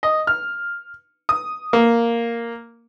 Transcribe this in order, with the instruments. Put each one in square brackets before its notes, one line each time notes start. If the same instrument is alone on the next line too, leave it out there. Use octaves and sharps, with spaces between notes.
[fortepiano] D#5
F6
D#6
A#3